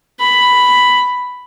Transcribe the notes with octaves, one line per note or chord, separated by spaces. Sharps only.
B5